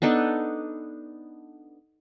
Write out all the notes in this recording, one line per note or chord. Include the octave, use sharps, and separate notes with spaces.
B3 D4 D#4 A4